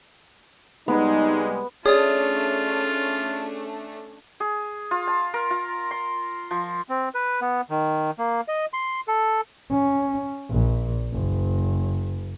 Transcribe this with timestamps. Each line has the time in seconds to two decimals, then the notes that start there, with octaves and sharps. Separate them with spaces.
0.88 C2 G3 G#3 B3 D#4
1.86 A3 C#4 D4 F4 G#4 C#5 D5 D#6
4.40 G#4
4.91 F4
5.07 A5
5.34 A#4
5.50 F4
5.91 C6
6.51 F3
6.89 C4
7.15 B4
7.42 B3
7.70 D#3
8.19 A#3
8.48 D#5
8.73 C6
9.08 A4
9.71 C#4
10.50 A#1
11.11 F#1